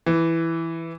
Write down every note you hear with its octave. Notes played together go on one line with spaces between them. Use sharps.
E3